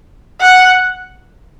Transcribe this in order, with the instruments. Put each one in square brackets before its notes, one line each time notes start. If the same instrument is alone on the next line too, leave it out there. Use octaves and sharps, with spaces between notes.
[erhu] F#5